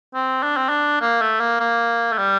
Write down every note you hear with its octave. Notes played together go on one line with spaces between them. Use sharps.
C4
D4
C4
D4
A#3
A3
A#3
A#3
A3
G3